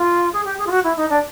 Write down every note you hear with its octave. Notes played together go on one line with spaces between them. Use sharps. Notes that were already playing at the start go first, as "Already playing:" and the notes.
Already playing: F4
G#4
G4
G#4
F4
F#4
E4
D#4
D4